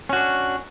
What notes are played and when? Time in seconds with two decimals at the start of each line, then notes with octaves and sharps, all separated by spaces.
0.09 C#4
0.13 F#4
0.16 D4